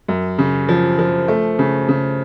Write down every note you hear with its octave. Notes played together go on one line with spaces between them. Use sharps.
F#2
C#3
F3
F3
A3
C#3
C#3